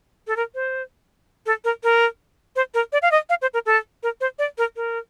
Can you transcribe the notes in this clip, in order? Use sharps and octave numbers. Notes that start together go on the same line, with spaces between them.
A4
A#4
C5
A4
A#4
A#4
C5
A#4
D5
F5
D#5
F5
C5
A#4
A4
A#4
C5
D5
A#4
A#4